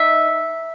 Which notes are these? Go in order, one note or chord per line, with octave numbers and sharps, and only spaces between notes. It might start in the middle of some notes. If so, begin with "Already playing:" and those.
Already playing: D#4 E5